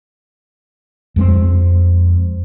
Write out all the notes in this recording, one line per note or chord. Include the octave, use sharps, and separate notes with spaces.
F2 G#3 A#3 C4